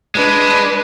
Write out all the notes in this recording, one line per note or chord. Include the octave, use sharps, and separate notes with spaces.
G#3 D4 B4